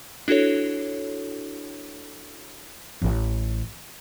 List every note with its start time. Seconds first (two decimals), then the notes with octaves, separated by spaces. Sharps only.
0.28 D4 E4 F#4 A4 C#5
3.02 A1